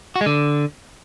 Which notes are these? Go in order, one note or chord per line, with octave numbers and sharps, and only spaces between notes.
F#4
G#3
D3